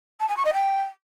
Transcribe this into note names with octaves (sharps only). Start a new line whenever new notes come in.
A5
G#5
C#6
D#5
G5